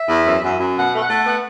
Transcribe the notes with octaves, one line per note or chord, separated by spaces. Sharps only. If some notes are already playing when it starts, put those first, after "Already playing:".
Already playing: E5
E2
F#2
F#2
F#2
B2 F#5
A3
F#5
A3
B3 F#5